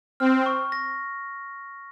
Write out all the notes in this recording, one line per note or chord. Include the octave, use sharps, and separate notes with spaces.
C4 F6
C#6
A#6